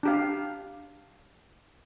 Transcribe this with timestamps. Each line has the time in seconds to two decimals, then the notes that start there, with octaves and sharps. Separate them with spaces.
0.03 D4 G4 F5